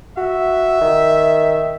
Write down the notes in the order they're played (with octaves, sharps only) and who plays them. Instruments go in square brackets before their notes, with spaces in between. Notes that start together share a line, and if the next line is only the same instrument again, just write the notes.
[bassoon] F#4 [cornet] E5
[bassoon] D#3